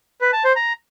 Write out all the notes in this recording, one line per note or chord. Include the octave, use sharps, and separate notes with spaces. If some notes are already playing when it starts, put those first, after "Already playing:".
B4
A5
C5
A#5